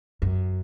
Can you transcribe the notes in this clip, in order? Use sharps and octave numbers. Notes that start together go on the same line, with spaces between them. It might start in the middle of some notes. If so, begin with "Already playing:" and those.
F#2